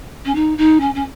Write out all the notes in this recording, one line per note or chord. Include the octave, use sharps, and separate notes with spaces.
C#4
D#4
D#4
C#4
C#4